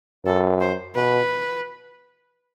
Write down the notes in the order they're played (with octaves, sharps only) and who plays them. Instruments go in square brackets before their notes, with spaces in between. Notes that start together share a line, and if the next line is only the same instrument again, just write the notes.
[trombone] F#2 [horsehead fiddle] A4
[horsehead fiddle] C5
[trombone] B2 [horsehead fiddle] B4